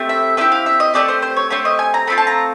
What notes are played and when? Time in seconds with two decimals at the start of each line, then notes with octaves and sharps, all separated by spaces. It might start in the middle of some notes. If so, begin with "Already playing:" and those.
Already playing: A3 C4 E4 G4
0.09 E5
0.37 A3 C4 E4 G4 E5
0.52 F5
0.66 E5
0.80 D#5
0.94 A3 C4 G4 D5
1.08 C5
1.22 C5
1.37 C#5
1.50 A3 C4 G4 C#5
1.65 D#5
1.79 G#5
1.94 A#5
2.07 A3 C4 F4 B5
2.18 A5
2.27 A#5